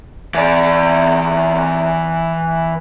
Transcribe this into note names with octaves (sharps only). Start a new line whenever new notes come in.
E3 D5